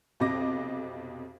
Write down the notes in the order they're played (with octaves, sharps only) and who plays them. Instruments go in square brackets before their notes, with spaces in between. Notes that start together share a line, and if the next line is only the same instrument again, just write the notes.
[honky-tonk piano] B1 F2 C3 D#5 D6 A#6